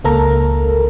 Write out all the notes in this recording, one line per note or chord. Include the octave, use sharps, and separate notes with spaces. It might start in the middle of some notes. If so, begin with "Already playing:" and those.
C#2 A#3 A4 A#4 A#5